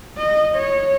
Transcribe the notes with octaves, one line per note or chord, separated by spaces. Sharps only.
D#5
C#5